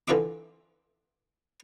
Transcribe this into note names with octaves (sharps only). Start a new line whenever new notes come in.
D3 E3 F4 E5 D6